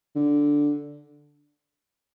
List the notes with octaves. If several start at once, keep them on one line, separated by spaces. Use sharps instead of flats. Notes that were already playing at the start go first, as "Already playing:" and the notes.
D3